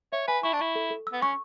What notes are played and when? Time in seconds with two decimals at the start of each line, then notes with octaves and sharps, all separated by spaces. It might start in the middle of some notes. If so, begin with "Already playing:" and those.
0.12 C#5 E5
0.28 B4 G#5
0.43 E4 C#6
0.53 D4
0.59 E4 C#6
0.75 A4
0.91 A4
1.07 E6
1.13 B3
1.22 C#4 C#6